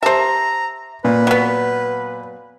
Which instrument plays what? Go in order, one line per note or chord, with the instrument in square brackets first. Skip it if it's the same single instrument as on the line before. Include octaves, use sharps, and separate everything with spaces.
[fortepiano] G4 A5 [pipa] C5 E5 [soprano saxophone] A#5
[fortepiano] A#2 [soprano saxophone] B4
[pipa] F#3 B3